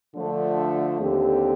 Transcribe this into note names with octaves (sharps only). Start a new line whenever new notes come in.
D3 F3 A3
D#2 D3 A3 C4 G4